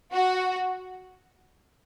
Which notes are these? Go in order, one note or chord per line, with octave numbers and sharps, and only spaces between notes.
F#4